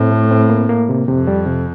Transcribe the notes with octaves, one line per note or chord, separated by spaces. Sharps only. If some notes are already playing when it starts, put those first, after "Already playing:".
Already playing: A2 C4
A3
C4
A#3
A#3
C3
F2 C3
G3
C3